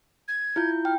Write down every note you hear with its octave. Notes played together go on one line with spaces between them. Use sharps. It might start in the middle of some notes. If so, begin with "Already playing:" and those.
G#6
E4 F4 G6
G5 F6